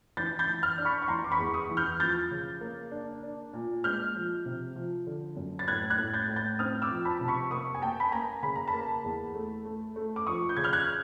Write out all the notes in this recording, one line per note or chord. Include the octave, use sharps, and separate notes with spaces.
E3 G6 A6
G6 A6
E3
F6 G6
D4
B5 C#6
C#6
E3 A#5 C6
D6
B5 C#6
E2
C#6 D#6
E3
F6 G6
F3 G6 A6
C#3
A#3
D4
D4
A#2
G#3 F6 G6
F3
C3
F3
D3
F#2
A6
A2 F#6 G#6
F#6 G#6
A2
G6 A6
A2
G6 A6
C4 D#6 F6
D6 E6
F3
A5 B5
C3
B5 C#6
A#3 C#6 D#6
G#5
A#3 G5 A5
B5
A#3 G#5 A#5
C#3 B5
A#5
A5 B5
A#3
E2
A3
A3
A3
D6
F3 C#6 D#6
G6
C#3 G#6
F6 G6
F#6 G#6